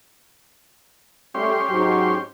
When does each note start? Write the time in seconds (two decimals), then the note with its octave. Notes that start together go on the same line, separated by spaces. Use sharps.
1.35 G3 A3 C#4 G4 C6
1.69 G#2 F#3